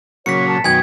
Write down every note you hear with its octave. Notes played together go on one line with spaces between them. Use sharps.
A#2 C#3 F#3 C#5 B6 C#7
A5
F#2 B2 D#3 G5 G#5 G#6